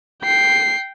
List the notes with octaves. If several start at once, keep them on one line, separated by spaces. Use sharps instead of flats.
G5 C7